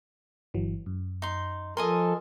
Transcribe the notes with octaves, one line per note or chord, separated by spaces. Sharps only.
G1 E3 F#3
F#2
D#4 C6
F3 A4 A#4 D#5 G#5 C6